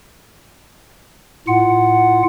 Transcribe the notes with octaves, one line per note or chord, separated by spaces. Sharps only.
A2 F4 F#5